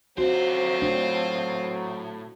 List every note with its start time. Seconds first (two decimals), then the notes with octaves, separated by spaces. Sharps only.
0.18 D3 F#3 C4 F4 F#4 C5
0.82 A2 D4